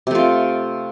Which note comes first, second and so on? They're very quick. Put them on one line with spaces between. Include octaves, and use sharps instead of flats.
C3 A3 F4